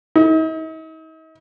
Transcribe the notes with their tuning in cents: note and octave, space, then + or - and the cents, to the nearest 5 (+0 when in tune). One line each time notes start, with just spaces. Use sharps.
D#4 +45